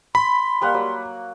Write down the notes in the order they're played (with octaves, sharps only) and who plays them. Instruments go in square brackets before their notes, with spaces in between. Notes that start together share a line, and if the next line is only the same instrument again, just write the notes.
[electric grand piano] B5 [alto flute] C6
[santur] G3 A#3 F#5
F#3